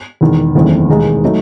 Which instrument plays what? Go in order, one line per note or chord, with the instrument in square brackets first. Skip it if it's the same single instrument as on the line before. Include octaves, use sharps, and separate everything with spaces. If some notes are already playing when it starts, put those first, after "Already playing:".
[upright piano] E1 E2 D#3
F#1 E2 D#3 A3 C4
E1 D#2 D#3 G#3 D#4
F#3 A3 D#4